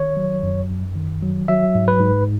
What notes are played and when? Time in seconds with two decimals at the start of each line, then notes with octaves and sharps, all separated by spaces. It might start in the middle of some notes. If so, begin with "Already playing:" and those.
Already playing: D#3 C#5
0.17 F#3
0.43 F#2
0.69 F#2
0.96 D#3
1.23 F#3
1.48 F#3 E5
1.75 G#2
1.88 B4
2.00 G#2